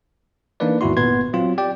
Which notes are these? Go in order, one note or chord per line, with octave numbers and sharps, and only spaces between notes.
E3 A#3 D4 D#4 B4 D5
E2 G#2 D#3 E4 F#4 C6
G1 A#2 B3 B4 C6 G#6
F#3 C4 F4
G4 D5 G5